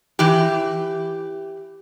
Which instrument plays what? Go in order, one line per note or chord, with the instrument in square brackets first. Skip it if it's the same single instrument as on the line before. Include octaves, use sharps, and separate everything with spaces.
[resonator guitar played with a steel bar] E3 G4